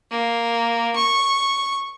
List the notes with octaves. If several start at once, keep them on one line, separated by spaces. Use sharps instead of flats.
A#3
C#6